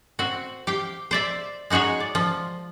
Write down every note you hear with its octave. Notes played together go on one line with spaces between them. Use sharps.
C4 F#4
G4 F5 G5
C5 D5 E5
G#3 D#4 F#4 G#4 C#5
D5
F3